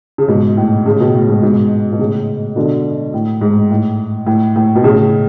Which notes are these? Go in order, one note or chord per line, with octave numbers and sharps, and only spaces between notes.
C#3
G#2 B2
A2
C#3
B2
A2
G#2
G#2 B2
B2
A2 C#3
B2 D3
A2
G#2
A2
A2
A2
B2
A2 C#3